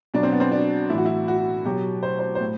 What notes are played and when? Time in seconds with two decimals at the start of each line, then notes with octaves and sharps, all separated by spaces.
0.14 B2 F#3 D4
0.23 C4
0.32 B3
0.40 C4
0.52 D4
0.90 A2 E3 E4
0.98 F#4
1.06 E4
1.28 F#4
1.65 B2 F#3 G4
2.03 C5
2.19 C5
2.35 C5
2.41 A2